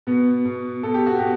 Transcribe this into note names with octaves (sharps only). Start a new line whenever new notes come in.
B2 B3
B2
B2 A4
G4
F#4
B2 G4